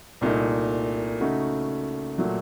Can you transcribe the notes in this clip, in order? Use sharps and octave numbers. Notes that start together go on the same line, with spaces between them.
C2 A#2 A3 D#4
C#3 A3 D#4 F#4
A#2 F#3 A3